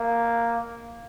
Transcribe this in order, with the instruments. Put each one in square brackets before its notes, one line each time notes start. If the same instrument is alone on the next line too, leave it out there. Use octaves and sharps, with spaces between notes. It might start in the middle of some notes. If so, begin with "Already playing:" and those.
Already playing: [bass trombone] A#3